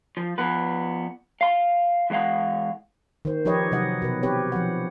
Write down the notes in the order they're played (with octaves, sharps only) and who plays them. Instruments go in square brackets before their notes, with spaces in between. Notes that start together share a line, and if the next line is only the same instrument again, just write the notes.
[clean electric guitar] F3
F3 B3 B4
F5 C6
E3 G#3 C#5 F5 F#5
[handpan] D#3 C5
F3 D#4 G4 B4 C#5 D#5
C3 F#3 D#4 D#5 F#5
B2 B4
C4 G4 B4 C#5
F3 F#5